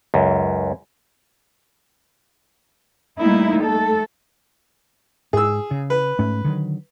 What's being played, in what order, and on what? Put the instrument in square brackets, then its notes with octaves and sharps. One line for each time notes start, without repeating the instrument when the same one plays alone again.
[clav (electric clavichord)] C#2 F#2
[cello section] G3 A3 A#3 D#4 E4
A3 A4
[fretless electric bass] G#2 [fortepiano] G#4 E6
[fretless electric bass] C#3
[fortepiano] B4
[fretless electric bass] G#2 A3 C#4
D3 D#3 F#3